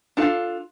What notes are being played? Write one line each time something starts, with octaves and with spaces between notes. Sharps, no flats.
D4 F4 A4 F5